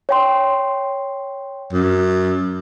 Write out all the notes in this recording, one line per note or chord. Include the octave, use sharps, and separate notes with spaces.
C#5 G5 C6
F#2